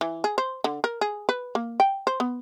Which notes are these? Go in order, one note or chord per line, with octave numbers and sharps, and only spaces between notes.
E3
G#4
C5
D3
A#4
G#4
B4
A#3
G5
C5
B3